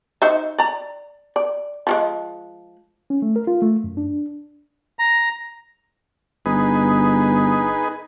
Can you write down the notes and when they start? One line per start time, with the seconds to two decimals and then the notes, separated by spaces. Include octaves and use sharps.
0.22 D#4 C5 E5
0.58 D5 A#5
1.36 D5
1.87 F3 G3 G#3
3.10 C#4
3.22 A3
3.36 A#4
3.47 F4
3.62 A3
3.84 F#2
3.97 D4
4.99 A#5
6.46 G1 D#4 G#4 B4